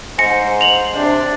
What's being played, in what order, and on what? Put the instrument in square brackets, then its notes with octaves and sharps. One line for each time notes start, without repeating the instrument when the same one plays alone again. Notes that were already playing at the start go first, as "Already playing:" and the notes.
[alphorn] G#2 [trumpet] C5 [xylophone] G#5 A#6 C#7
[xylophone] F7 F#7
[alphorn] C3 [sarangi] D4